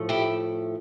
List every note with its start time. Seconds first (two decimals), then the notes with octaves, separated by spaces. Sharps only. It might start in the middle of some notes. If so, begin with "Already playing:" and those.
Already playing: A2 F3 A3
0.09 E4 G4